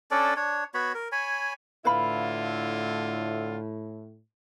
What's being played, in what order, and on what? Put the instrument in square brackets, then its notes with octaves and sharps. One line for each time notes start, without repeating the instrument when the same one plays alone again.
[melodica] C#4 D4 A4 D5
D4 C#5
B3 F#4 C#5 B5
A#4
C#5 G#5 B5
[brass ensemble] A2 [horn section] D3 E4 F4 [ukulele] B4 F5 B5